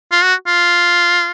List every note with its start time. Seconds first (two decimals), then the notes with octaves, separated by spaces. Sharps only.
0.11 F4
0.23 F#4
0.47 F4